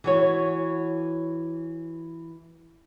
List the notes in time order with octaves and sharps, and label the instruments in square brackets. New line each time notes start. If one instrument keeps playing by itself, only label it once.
[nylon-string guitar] E3 F#4 C#5